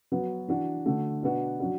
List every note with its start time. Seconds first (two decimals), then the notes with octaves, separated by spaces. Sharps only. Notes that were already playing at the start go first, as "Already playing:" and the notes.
0.12 F#3 B3 F#4
0.48 E3 D4 F#4
0.86 D3 A3 F#4
1.22 B2 B3 D4 F#4
1.60 F#3 D4 F#4